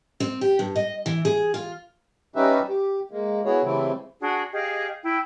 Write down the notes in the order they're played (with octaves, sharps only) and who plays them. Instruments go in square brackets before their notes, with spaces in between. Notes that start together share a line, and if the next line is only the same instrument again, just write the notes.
[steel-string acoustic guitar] C4
G4
G2
D#5
E3
G#4
F4
[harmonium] G3 C#4 D#4 G4 B4 E5
G4
G#3 A#3
B3 E4 F#4 G#4 C#5
C#3 E3 G3 A3 C4 E4
[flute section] D4 F#4 G#4 F#5
G4 G#4 D#5 F5
E4 G5